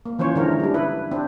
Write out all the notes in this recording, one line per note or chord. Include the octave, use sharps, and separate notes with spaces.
A#3
E3 F3 C#4 C5 C#5
D3 E3 G#3 A#4
G3 D4
E4 B4
C4 D4